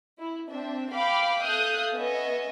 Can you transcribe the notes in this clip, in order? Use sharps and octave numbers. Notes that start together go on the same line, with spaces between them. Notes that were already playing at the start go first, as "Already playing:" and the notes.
E4
C4 D4 E5
F5 G5 B5 D6
A4 E5 F5 D#6 F#6 G6
B3 C#4 D#5 E5